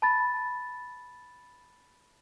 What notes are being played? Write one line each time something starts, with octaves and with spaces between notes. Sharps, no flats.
A5 B5 A6